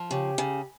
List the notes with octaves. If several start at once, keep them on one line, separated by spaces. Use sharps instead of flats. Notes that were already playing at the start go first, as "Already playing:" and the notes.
Already playing: F3
C#3 G4
C#3